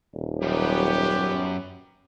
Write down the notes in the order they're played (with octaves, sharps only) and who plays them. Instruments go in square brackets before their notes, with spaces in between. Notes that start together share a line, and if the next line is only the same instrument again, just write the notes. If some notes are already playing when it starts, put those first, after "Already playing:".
[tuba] D#1
[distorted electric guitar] F#2 [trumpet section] B3 G4